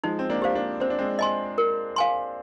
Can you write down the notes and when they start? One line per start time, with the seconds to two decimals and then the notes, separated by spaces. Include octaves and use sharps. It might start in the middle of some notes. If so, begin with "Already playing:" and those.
0.04 F3 G#3 D#4
0.19 C4
0.30 A#3 D4
0.42 G4 C5 F5
0.55 A#3 D4
0.80 C4 C5
0.90 D4
0.98 G#3 C4
1.19 D#5 G#5 C6
1.58 A#4
1.96 F5 G#5 C6